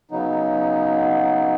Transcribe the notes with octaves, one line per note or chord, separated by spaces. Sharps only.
C#3 F#3 B3 D#4